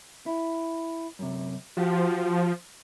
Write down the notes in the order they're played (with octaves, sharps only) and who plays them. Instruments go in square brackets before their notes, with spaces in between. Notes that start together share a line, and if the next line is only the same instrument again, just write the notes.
[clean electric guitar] E4
F#2 C3
[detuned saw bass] F3 [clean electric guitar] F#4 G4